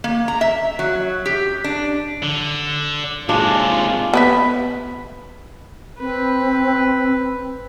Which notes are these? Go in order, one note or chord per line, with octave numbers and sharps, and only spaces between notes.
A#3
A#5
E5
F#3
G4
D4
D3
D#2 C3 G#3 D4 F4
B3 B4 E5
C4 B4